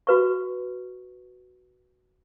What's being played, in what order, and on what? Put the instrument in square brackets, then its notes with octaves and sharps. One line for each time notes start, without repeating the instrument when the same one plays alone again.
[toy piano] F#4 B4 C#6